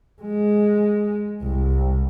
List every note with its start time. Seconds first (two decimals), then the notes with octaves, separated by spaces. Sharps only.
0.22 G#3
1.43 C2